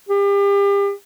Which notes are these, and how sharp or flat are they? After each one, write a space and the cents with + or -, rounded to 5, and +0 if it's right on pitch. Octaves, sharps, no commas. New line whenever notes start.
G4 +35